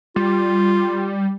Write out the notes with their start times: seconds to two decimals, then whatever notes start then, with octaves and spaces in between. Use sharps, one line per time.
0.16 G3 F4